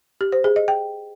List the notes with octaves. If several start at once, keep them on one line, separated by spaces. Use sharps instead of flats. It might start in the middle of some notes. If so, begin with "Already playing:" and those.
G4
C5
G#4
D#5
G5